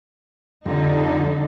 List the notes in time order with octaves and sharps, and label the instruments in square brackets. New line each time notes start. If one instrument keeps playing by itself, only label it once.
[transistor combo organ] F2 G3 [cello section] D3 D#4 A4